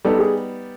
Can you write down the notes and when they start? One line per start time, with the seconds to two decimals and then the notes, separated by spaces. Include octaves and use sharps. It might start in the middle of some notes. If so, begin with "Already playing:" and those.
0.05 G3 B3 D#4 A4
0.19 G#4